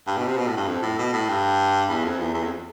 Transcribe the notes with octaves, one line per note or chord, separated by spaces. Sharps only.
G2
B2
C3
B2
A2
G2
F2
A2
B2
A2
G2
E2
F2
E2
E2
F2